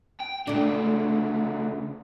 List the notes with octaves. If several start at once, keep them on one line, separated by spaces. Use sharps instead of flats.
G5
C#2 D3 A3 D4